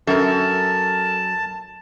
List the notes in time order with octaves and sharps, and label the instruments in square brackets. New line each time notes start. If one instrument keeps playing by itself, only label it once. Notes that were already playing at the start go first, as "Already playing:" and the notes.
[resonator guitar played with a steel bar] F#2 [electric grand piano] A4 A#4 [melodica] A5